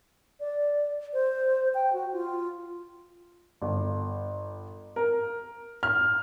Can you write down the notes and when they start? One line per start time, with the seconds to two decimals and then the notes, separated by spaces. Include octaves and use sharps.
0.40 D5
1.13 C5
1.74 G5
1.93 F#4
2.13 F4
3.62 G1
4.96 A#4
5.83 F6